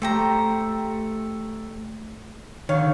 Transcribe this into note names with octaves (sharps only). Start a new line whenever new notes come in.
A3 G4 C5 G5 A#5
D3 D#3 C#5 F5